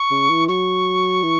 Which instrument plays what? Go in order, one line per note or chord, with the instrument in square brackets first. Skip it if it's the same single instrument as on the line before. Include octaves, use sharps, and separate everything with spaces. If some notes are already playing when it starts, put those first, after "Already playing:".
Already playing: [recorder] C#6
[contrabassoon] C#3
E3
[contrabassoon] F#3 [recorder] C#6
[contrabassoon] E3